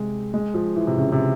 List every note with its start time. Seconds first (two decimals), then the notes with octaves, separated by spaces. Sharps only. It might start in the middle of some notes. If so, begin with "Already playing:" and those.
Already playing: C3 G#3
0.34 G#3
0.54 F3
0.76 E3
0.87 C3
0.97 C#3
1.12 C3